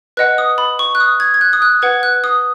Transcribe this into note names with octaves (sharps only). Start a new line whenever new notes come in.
B4 D#5 F#5 F#6
D#6
B5
C#6
F#6
D#6
G#6
G#6
F#6
D#6
F#6
B4 F#5 G#6
F#6
D#6